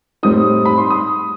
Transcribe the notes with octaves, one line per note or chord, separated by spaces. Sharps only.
A2 G3 C4 D#4 D#6
B5
C6
D#6